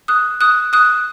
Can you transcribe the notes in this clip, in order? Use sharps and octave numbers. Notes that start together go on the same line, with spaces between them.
D#6 F#6
D#6 F#6
D#6 F#6